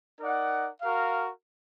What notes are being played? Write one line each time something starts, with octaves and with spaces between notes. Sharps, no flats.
D#4 A#4 D5 F#5
F#4 A#4 F5